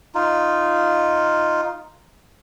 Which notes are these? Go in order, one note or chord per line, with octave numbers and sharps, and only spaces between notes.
D#4 F4